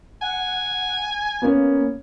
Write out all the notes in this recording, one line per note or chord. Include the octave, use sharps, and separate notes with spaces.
F#5 G#5
A#3 B3 C#4